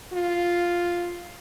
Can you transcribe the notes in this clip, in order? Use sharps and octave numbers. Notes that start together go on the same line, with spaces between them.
F4